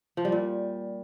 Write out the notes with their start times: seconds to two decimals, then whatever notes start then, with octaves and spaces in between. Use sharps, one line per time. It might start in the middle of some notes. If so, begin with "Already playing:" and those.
0.17 F3
0.25 G3
0.32 A#2